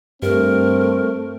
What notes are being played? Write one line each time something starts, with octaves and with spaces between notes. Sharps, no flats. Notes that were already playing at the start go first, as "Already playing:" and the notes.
G2 A3 C4 A#4